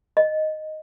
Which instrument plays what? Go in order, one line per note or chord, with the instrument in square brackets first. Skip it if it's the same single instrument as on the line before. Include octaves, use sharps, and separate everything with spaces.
[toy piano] D#5